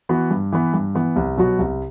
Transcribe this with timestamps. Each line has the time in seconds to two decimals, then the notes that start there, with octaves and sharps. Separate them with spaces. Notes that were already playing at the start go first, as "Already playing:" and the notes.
0.09 E3 B3 F#4
0.31 G2
0.53 E3 B3
0.74 G2
0.95 E3 B3
1.16 C2
1.37 B2 F#3 B3 F#4
1.59 C2